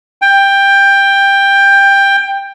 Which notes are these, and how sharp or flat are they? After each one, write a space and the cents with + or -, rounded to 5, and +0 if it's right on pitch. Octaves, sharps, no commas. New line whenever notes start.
G5 +15